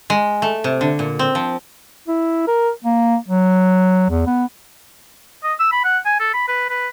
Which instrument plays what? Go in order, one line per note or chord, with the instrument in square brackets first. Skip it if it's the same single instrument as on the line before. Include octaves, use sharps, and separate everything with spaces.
[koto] G#3
A3
C3
D3
A#2
C4
F3
[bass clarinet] E4
A#4
A#3
F#3
E2
B3
[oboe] D#5
E6
B5
F#5
G#5
A4
B5
B4
B4